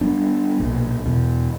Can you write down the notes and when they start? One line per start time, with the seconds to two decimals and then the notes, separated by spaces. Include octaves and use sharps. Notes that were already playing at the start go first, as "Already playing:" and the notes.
0.01 G3 B3 D4
0.60 B1 A#2
1.06 E2 B2